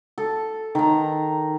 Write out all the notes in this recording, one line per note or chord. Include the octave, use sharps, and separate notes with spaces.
A4
D#3 A#5